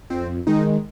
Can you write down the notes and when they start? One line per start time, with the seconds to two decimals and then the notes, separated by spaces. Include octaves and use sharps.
0.10 F2 C4
0.47 D#3 G#3 D#4